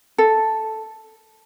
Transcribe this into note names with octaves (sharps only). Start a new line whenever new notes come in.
A4